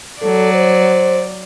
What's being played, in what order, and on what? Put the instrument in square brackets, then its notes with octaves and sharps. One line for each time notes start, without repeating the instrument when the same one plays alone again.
[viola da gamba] F#3 D5 [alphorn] A4
[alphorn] C5